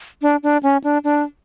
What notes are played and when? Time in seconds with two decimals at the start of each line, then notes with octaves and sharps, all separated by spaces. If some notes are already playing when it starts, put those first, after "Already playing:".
0.22 D4
0.43 D4
0.63 C#4
0.84 D4
1.04 D4